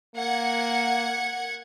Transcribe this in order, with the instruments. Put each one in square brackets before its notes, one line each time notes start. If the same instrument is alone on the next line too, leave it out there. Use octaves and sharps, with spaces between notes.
[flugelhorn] A#3 [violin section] F#5 G#6 C#7